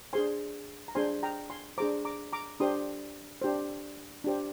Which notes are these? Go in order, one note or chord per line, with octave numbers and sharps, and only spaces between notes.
D4 G#4 C5 G#5 C6
A#5
D4 G#4 C5 G#5 C6
G5 A#5
G#5 C6
D4 G#4 C5 A#5 D6
A#5 D6
A#5 D6
D4 G4 C5 C6 D#6
D4 G4 C5
D4 G4 C5